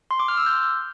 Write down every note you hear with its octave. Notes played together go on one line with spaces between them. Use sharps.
C6
D6
F6
E6
G6